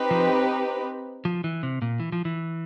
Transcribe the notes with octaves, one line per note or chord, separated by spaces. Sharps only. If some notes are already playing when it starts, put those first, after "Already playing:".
Already playing: C4 D#4 G4 B4
F3
F3
E3
C3
A#2
E3
F3
E3